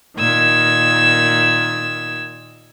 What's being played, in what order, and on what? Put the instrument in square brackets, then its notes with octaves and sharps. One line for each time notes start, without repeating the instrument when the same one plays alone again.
[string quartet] A#2 D#3 E6 G#6